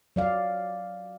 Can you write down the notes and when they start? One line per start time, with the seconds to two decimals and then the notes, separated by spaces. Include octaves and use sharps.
0.16 F#3 D5 F5